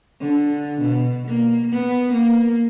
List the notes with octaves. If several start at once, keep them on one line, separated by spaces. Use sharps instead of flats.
D3
B2
A#3
B3
A#3